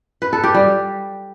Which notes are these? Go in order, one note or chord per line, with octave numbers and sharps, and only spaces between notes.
B4
A4
G4
G3